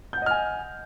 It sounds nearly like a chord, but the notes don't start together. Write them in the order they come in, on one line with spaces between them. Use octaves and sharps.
G6 F#5 D#5 F6 G#5